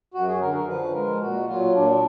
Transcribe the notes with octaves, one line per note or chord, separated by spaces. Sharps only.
F#2 F#4
G#4
D3 A#4
A#4
F3 B4
G#3 A#4
A#2 F#4
F#3 F4
A#2 D4